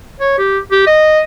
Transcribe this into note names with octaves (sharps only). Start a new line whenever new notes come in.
C#5
G4
G4
D#5